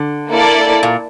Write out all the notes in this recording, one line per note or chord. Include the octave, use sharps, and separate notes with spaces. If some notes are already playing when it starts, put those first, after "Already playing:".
Already playing: D3
A#3 E4 A4 D5
A#2